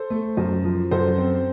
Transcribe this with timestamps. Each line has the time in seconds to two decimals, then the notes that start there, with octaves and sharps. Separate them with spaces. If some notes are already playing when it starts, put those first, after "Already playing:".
Already playing: A4 C5
0.10 A3
0.37 F#2
0.64 F3
0.91 F#2 A4 C5
1.18 C4